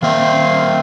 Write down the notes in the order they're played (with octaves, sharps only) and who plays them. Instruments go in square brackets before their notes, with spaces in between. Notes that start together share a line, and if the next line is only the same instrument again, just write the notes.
[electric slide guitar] D#3 A#3 E5 [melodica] C4 F5